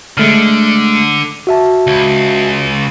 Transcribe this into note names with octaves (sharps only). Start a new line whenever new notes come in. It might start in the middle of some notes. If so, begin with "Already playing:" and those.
D3 G#3 A3 F6
F#4 E5 A5
C#2